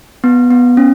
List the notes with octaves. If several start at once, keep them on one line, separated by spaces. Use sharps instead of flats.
B3
B3
C#4